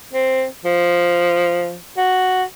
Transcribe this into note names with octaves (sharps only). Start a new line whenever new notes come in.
C4
F3
F#4